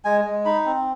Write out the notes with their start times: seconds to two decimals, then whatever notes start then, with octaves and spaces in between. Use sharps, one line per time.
0.05 G#3 G#5
0.25 G#3
0.45 D#4 B5
0.66 C4